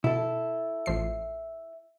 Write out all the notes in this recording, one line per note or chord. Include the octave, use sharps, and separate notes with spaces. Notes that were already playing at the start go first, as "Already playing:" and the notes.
B2 E4 A4
A1 F3 C7